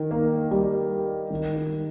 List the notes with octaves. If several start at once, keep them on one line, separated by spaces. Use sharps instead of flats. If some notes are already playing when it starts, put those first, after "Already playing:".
Already playing: D#3
A#3
G3
D#3
D#3